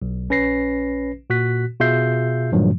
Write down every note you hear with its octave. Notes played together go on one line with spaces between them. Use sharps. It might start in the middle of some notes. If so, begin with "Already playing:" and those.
B1
A#1 C#4 B4 A#6 C7
A#2 F#4 F#6 B6
B2 F4 G#4 E5 G6 C7
G2 A#2 D#3 F3 F#3 G#3